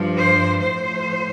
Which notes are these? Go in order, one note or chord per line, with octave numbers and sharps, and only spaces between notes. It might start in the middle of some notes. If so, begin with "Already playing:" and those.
Already playing: G2 F3
C5
A2 F3 C5